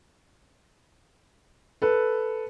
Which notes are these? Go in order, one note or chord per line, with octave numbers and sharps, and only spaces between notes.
A4 B4